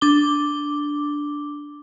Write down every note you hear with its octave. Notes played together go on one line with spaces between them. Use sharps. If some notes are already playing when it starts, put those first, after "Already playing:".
D4 D6 G7